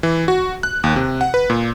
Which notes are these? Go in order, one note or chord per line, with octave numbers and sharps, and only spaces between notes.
E3
F#4
F#6
D#2
C3
F#5
B4
A#2